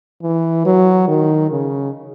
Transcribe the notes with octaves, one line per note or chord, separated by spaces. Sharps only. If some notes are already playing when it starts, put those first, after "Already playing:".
E3
F#3
D#3
C#3